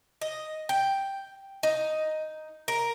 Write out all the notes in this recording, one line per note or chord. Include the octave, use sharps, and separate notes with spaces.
D#5
G5
D#4
A#4